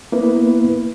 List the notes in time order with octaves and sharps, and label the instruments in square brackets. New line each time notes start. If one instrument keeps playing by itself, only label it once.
[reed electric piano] A#3 B3 E4 B4